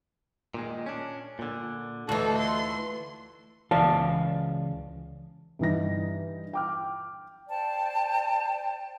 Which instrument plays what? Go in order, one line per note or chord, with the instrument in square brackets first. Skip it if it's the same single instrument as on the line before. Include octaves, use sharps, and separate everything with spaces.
[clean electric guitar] A#2 D#3 G#3
C#4 D4
A#2 D3
[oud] D2 E3 [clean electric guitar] D#4 F4 F#4 [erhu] A4
[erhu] C6
[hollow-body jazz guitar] C#2 E3 F4 D5 F5 A5
[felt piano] G2 E3 D#4 A#6
G5 D6 F6
[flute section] C5 D5 G5 A5